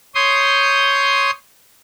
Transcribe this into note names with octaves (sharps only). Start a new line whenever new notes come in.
C#5 C6 D#6 G6